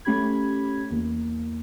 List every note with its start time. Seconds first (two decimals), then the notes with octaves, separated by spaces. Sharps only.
0.05 A3 C#4 G4 B5 G#6
0.91 E2 A#3